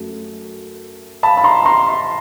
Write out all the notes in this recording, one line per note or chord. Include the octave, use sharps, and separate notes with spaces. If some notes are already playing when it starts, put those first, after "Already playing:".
Already playing: F#2 F#3 A3
A5 B5
B5
A#5 C6
A#5 C6